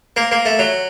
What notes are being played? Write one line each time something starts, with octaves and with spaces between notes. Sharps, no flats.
A#3
A#3
A3
F#3